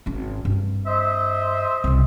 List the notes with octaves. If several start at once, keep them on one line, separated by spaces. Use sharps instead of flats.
G#1 C#4
G2 C4
C5 D#5 E5
C2 C#3